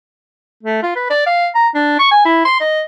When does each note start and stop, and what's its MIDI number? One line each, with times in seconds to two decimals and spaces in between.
0.63 0.81 57
0.83 0.93 65
0.96 1.08 71
1.10 1.25 74
1.27 1.48 77
1.55 1.68 82
1.74 1.99 62
1.99 2.10 85
2.11 2.20 80
2.25 2.42 64
2.45 2.57 84
2.60 2.82 75